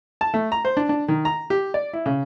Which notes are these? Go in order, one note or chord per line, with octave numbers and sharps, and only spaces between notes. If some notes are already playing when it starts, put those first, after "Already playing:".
A5
A3
A#5
C5
D4
D4
D#3
A#5
G4
D5
E4
C#3